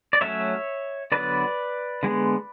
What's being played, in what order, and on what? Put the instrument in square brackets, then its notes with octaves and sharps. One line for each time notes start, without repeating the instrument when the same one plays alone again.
[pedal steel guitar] D5
F#3 A3 C#4 C#5 E5
D3 F#3 B3 B4 D5
D3 G#3 B3